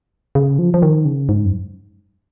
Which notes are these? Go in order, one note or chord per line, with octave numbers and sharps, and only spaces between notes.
C#3
F3
F3
D#3
C#3
G#2
F#2